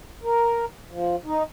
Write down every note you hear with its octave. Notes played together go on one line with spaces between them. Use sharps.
A#4
F3
D#4